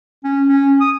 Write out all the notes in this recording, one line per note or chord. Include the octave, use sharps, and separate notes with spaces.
C#4
C#4
D#6